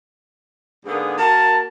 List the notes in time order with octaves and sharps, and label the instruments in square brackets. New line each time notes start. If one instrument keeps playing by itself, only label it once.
[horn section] G#2 D3 A#3 B3 G#4
A#3 F#4 A#4 A5